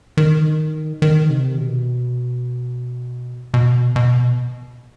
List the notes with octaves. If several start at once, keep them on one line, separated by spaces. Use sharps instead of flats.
D#3
D#3
C3
B2
B2
B2